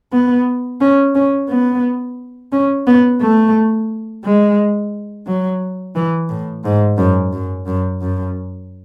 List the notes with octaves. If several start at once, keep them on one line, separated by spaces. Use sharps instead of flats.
B3
C#4
C#4
B3
C#4
B3
A3
G#3
F#3
E3
A2
G#2
F#2
F#2
F#2
F#2